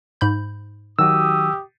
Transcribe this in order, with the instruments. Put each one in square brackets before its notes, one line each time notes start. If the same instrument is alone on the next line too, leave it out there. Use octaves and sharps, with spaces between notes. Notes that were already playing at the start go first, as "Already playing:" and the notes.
[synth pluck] G#2 B5 G6
[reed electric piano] D#3 F#3 F#4 [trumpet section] G4 D#6 [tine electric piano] E6